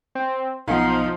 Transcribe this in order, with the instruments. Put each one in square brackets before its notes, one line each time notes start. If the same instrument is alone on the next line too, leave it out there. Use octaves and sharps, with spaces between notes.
[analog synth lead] C4
[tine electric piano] B1 B3 [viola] F3 [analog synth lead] D#4 [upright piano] F5 F#5